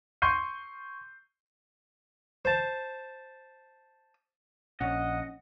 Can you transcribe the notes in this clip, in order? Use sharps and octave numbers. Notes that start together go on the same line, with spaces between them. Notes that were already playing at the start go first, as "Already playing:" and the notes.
C6 C#6 G6 C7 D#7
C5 A5
A#1 C#4 D#5 F#5